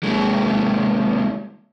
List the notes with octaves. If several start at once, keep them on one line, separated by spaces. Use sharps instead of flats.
D#2 G#3